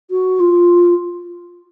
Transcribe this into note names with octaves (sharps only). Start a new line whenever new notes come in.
F#4
F4